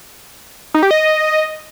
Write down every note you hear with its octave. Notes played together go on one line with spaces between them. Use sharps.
D#4
G4
D#5